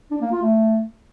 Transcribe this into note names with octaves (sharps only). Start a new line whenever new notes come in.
D4
A#3
F4
A3